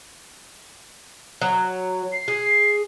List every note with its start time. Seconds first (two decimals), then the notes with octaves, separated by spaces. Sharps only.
1.42 F#3
2.13 C7
2.28 G#4